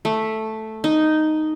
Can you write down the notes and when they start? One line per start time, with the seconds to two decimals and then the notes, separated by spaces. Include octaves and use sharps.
0.05 A3
0.84 D#4